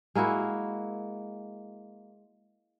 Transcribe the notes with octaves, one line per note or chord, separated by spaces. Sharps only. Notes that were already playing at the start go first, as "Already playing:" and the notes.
G#3 A#3 E4 F#4